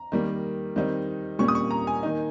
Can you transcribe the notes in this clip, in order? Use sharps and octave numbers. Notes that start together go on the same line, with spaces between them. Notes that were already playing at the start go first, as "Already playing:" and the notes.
Already playing: A#5
D#3 G3 A#3
D#3 G3 C4 D#4
A#2 G3 A#3 C#4 C#6
D#6
C#6
A#5
G#5
D#3 A#3 D#4